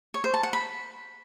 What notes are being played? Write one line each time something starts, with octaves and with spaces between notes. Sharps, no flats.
C#5
C5
A5
F#5
B5